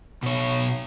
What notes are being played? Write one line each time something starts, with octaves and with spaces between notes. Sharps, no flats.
B2 C#5